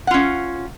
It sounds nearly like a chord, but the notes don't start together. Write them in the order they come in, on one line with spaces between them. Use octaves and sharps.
F#5 F4 C#4